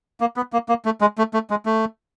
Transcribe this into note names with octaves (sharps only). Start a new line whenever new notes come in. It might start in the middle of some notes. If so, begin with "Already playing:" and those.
A#3
B3
A#3
A#3
A3
G#3
A3
A3
G#3
A3